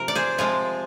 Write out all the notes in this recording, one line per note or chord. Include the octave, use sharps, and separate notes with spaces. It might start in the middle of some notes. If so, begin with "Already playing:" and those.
Already playing: C3 F3 A#4
D5
G#4 C5
C3 F3 G#3 F4 G#4